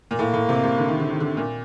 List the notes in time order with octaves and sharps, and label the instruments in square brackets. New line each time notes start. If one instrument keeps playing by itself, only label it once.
[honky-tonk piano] A#2
[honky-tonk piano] A2 [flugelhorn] A#3
[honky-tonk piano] A2
C3
C3
D3
D#3
D3
D#3
D3
A#2